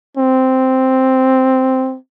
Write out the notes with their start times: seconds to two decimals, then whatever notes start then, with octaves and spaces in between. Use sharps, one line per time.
0.17 C4